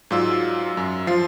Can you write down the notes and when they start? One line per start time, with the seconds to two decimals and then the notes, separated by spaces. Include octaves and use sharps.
0.11 G#2 F#3 F4 D5 E6
0.77 F#2
1.07 F3 F4 C7